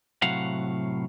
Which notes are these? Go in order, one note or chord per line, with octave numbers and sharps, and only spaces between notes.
A2 C3 F#3 F5 F#5